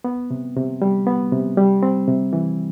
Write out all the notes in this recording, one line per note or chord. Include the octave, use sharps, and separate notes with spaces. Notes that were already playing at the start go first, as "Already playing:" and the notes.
B3
C3
C3
G3
B3
C3
G3
C4
C3
E3